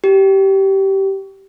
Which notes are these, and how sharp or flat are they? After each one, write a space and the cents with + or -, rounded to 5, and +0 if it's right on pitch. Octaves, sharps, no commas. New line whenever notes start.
G4 -15